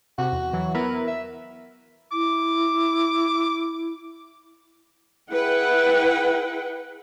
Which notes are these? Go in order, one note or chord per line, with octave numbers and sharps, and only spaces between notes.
C3 F#4
E2
E3 F#3
B3 E4 A#4 B4
E5
E4 D6
E4 G#4 B4 F#5 G5